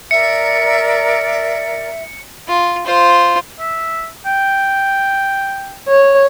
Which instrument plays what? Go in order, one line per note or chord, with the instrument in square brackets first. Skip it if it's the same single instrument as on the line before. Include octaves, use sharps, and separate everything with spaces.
[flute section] A#4 D5 [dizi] E5 [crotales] C#7
[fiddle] F4
F4 C5
[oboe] E5
G5
[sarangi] C#5